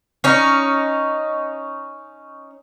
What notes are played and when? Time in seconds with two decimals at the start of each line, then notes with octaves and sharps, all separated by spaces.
0.24 C#4 D#4